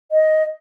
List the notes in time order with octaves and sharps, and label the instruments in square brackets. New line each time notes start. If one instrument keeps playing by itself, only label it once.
[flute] D#5